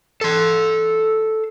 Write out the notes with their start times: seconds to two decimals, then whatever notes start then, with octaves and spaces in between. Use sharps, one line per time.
0.21 A4 C6